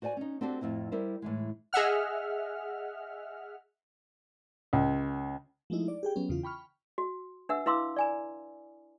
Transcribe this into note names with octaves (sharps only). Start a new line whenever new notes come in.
F#4 C5 D5 F#5 G#5
C#4 D#4
C4 D4 F#4 G4 A4 C5
F2 A2 C4 E4
G3 E4 A#4 C5
A2 E3 G#3
G#4 D#5 E5 F#5 F6
C#2
F3 G#3 A3 D#4 E4
D5
G4 G#4 G5
F#3 B3 C#4
E2 C#3 E3 F4
G5 B5 C#6 F6
F#4
D4 B4 E5 F#5 E6
E4 B4 F5 C6 D6 E6
D5 G#5 A#5